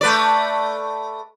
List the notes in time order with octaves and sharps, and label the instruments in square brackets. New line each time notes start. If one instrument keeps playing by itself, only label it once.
[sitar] A3 B4 D5